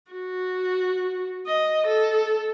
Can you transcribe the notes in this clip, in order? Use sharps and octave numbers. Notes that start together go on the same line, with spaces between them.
F#4
D#5
A4